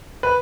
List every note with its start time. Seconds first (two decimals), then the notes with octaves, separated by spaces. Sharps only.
0.23 B4